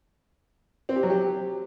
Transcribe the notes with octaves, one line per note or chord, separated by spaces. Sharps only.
C4
G4
F#3
G4